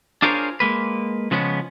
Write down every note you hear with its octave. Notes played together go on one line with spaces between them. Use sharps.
D4 F4 G#4 A#4 C5 C#5
G#3 A#3 B4
C#3 F3 G#3 B3 C#4